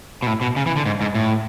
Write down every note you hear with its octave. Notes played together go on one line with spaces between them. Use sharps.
B2
A2
B2
C#3
E3
D3
G#2
G#2
A2